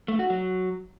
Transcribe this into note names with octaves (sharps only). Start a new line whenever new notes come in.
A3
F#4
F#3